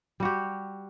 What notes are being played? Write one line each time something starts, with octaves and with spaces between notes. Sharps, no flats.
G3 F#4 G4